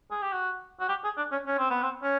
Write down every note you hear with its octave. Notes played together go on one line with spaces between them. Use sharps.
G#4
G4
F#4
F#4
G4
G#4
D4
C#4
C#4
C4
B3
C4
C#4